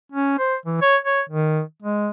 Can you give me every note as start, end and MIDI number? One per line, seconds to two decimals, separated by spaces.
0.12 0.39 61
0.39 0.55 72
0.66 0.77 52
0.82 0.97 73
1.05 1.21 73
1.30 1.62 51
1.82 2.10 56